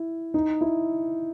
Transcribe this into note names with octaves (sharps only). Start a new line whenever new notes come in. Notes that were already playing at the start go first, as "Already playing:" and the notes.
Already playing: E4
D#4
E4